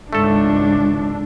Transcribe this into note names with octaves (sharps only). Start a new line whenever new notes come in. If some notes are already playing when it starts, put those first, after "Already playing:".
G#1 C#2 G#2 A3 D4 A4